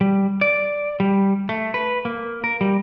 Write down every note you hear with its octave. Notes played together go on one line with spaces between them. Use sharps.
G3
D5
G3
A3
B4
A#3
A#4
G3